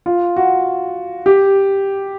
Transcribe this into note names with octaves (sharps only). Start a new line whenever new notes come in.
F4
F#4
G4